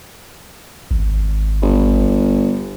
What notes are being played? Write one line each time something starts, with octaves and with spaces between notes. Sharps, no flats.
G#1
G1